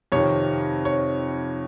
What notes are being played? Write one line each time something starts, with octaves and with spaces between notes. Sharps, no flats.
F2 C3 D#3 C#5
C#5